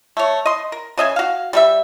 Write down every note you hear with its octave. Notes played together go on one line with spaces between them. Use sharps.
A3 C#5
D#5 C6
A#4
C#3 D#5 E5 G#5
F#4 F5
G3 A3 E5